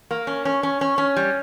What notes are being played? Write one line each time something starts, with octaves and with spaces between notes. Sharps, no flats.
A#3
C#4
C#4
C#4
C#4
C#4
G3